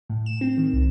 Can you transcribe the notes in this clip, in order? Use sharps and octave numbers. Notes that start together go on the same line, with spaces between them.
A2
E7
C4
D#3
C2